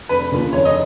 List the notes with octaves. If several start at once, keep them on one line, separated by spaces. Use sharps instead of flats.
F1 B4
D#2 C#3 F3 A#3
F1 C#5
D#5